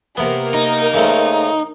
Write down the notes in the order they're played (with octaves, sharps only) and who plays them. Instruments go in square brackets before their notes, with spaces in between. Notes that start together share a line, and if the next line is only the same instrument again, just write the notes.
[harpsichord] C3 B3 [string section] A#3 A#4
[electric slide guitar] D#4
[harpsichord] C#3 A3 C4